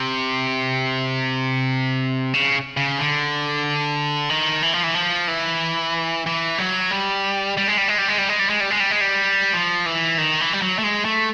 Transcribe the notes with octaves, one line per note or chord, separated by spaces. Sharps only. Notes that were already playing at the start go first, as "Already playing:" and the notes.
Already playing: C3
C#3
C#3
D3
D#3
E3
F3
E3
F3
E3
E3
F#3
G3
G3
G#3
G3
G#3
G3
G#3
G3
G#3
G3
G#3
G3
G#3
G3
G#3
G3
F3
E3
D#3
E3
G3
F#3
A3
G#3
A3